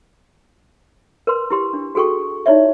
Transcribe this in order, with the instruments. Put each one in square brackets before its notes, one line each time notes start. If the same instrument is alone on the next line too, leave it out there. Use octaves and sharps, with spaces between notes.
[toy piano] A#4 B4 C6
E4 G4 C6
D4
F#4 G#4 A4 G5 C#6
D#4 E4 C#5 D5 E5